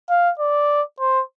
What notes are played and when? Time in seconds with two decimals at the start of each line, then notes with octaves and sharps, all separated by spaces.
0.10 F5
0.40 D5
1.00 C5